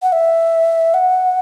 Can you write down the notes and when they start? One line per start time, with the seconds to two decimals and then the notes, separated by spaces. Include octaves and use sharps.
0.02 F#5
0.12 E5
0.94 F#5